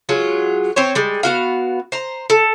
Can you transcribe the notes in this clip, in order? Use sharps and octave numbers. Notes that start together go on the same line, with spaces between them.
F#3 G#3 F4
C4 C5 C#5
G3 G#3
B3 F#4 F5
C5 A#5
A4